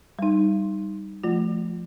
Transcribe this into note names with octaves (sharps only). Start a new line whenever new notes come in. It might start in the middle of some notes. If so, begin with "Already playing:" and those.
G3 D#4
F3 A3 F4